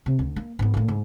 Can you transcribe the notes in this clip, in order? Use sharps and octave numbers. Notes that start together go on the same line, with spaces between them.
C3
D2
A#3
G#2 B3
A2 A#3
G#2